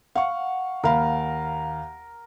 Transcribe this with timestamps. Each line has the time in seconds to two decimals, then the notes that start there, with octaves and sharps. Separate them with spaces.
0.15 F5 F#5 C#6
0.84 D#2 A#4 F5 B5